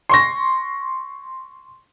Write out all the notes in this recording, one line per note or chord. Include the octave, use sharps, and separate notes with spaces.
C6 C#6 A#6